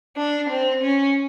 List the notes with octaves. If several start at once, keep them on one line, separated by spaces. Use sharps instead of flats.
D4
C4
C#4